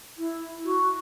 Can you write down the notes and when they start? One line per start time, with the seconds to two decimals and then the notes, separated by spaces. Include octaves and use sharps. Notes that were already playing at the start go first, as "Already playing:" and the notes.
0.18 E4
0.64 F#4